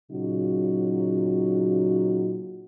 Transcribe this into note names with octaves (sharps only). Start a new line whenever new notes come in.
A#2 C#3 F#3 D#4 F4 F#4